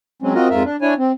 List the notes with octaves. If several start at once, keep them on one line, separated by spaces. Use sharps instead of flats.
F#3 G#3 C4 C#4
C4 F4 F#4 A#4 D#5
F2 G#2 F4 A#4 E5
D4
D4 E4 C#5 G#5
C4